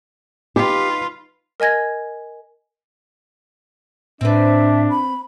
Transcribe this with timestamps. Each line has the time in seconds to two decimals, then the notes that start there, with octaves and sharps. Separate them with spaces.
0.56 D#4 F4 G4 B4
1.60 A#4 D#5 G#5 G#6 A#6
4.21 A2 C4 D4 B4 E5
4.90 B5